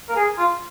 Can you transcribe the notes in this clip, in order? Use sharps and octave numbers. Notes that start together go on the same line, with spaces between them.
A#4
G#4
F4